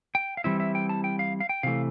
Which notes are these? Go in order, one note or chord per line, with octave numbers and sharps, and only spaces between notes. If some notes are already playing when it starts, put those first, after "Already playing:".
G5
F5
E3 G3 C4 E4 E5
E5
G5
A5
G5
F5
F5
G5
C3 E3 A3 F5